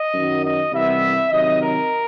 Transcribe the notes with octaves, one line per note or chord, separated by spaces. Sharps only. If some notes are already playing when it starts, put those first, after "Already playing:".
Already playing: D#5
F#2 D#3 F#3
D#5
C2 C3 E3 G3 B3 E5
C3 D#3 F#3 D#5
A#4